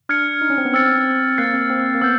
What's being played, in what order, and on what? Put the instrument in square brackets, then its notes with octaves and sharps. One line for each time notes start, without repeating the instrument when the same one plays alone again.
[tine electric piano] D4 [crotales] F6 G#6 C#7
[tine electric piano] D#4
C#4
C4
B3
[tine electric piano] C4 [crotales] E6 A6 C#7
[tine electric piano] A#3 [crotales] F#6 A6 C7
[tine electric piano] C4
C4
A#3
[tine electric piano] B3 [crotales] E6 G6